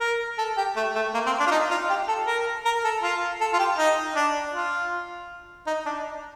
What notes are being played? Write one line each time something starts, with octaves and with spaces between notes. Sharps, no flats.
A#4
A4
G4
A3
A3
A#3
C4
D4
F4
D#4
F4
G4
A4
A#4
A#4
A4
F4
A4
F4
G4
D#4
D4
F4
D#4
D4